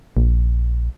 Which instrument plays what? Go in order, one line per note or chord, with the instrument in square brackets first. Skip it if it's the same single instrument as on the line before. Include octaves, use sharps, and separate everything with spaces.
[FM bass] A#1